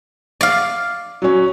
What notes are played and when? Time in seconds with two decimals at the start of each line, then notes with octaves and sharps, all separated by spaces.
0.41 D5 F5
1.22 F#3 C#4